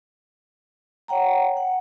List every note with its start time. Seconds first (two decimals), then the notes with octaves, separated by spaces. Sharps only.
1.08 C#5 F#5 G5 A#5
1.57 F#5